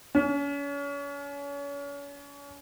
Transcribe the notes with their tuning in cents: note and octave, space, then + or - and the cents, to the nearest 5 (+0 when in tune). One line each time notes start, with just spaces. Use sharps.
C#4 +35